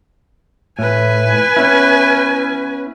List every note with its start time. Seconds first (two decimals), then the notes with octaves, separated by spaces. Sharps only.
0.79 A2 B4 G#5
1.57 B3 C#4 E4